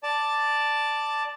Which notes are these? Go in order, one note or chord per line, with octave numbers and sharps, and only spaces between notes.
D5 A5